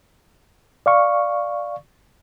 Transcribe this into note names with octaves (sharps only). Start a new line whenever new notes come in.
D5 F5 C#6